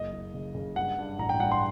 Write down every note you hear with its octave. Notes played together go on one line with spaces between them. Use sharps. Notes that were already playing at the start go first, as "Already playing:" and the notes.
Already playing: F#1 D#5
F#1
C#3
C#3
G2 F#5
G2
A1 A#5
G5
G2 F#5
C6